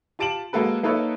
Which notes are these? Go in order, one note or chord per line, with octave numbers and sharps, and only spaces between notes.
F4 G4 A5 D7 E7 F#7
G#3 A#3 F#4 A4 B4
A#3 D#4 A4 B4 C#5 E5